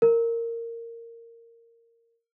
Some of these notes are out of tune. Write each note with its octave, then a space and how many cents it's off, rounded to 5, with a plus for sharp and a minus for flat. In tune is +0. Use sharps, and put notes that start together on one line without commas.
A#4 -15